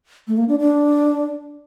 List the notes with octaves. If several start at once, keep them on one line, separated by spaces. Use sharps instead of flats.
A3
A#3
D4
D4